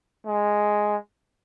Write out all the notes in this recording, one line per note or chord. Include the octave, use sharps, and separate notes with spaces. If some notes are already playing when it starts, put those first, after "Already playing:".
G#3